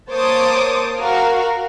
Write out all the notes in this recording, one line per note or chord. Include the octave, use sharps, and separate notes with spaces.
A#3 C5 C#5 A5 D6 D#6
F#4 A#4 F5